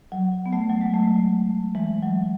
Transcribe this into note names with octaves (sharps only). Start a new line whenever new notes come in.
F#3
B3
F#3 A3
F#3
G#3
F#3 A3
E3 G#3
F#3